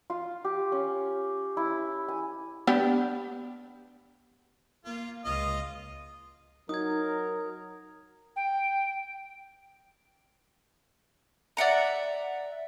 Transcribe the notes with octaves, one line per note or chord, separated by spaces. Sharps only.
F4
G4
C#4
E4
G#5
B3 D4 G4
A#3 F4
C#2 F4 D#5
F#3 D#4 A#4 D#6 G#6
G5
D5 E5 F#5 A#5